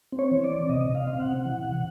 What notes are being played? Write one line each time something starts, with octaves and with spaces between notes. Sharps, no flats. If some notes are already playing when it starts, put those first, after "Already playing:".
C4
C#5
E3
D5
C4
C3 D#5
C3
F5
C4
F#5
C3
E3
C3